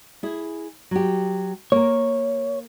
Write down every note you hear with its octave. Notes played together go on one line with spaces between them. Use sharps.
E4 G#4
F#3 G4
A#3 A#4 C#5